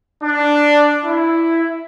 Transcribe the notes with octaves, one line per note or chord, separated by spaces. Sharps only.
D4
E4